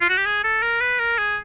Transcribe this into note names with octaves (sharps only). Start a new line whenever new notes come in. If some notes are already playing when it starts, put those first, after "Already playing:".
F4
F#4
G4
G#4
A4
A#4
B4
A#4
G#4